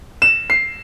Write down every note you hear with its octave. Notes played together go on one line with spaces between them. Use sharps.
E7
C7